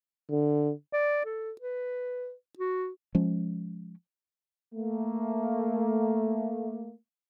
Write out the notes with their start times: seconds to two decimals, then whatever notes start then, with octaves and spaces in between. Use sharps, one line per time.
0.30 D3
0.93 D5
1.25 A4
1.61 B4
2.59 F#4
3.15 F3 G#3 C#4
4.75 A3 A#3